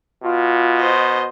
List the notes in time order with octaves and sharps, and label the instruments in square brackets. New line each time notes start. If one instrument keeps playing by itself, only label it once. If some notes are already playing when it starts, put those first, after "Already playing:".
[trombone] B2 [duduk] F4
[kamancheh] C5 D#5